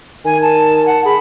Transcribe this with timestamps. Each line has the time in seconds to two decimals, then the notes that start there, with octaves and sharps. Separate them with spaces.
0.25 D#3 G#5
0.41 A5
0.86 F#5
1.05 G#4 B5